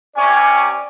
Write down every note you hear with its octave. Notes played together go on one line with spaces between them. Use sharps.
C3 C#4 D5 G#5